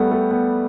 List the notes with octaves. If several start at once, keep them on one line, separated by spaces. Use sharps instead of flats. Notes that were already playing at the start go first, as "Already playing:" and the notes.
Already playing: G3 A3 B3
A3
B3